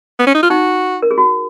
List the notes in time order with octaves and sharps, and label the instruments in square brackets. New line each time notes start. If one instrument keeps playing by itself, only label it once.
[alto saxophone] B3
C#4
D#4
F4
[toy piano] D#4 [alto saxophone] F#4
[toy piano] A#4
G#4
F#4